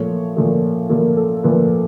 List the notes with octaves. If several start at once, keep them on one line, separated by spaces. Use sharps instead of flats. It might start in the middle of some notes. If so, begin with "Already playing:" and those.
Already playing: A#2 F3 A3 C#5
A#2 F3 A3
A#2 F3 A3 A#4
A4
A#2 F3 A3 B4